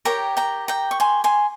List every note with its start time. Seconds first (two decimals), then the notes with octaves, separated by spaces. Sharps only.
0.05 G4 A#4 C#5 G5 A#5
0.37 G5 A#5
0.68 G5 A#5
0.91 C#6
1.00 G#5 C6
1.24 G#5 C6